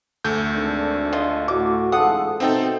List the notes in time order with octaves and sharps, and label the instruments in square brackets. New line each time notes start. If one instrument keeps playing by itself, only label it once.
[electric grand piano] D2 A3 G6
[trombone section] G#1 D4
[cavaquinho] F4 D#5
[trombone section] A2 F#4 [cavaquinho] D6
[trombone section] A1 G#2 A4 [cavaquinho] F4 F#5 D#6
[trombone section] B2 [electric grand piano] C4 D#4 A4 [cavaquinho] E5 G5